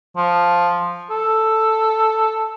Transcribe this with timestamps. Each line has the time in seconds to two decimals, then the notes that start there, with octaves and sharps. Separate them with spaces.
0.17 F3
1.10 A4